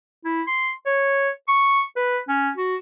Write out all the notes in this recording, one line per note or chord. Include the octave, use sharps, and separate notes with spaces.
E4
C6
C#5
C#6
B4
C#4
F#4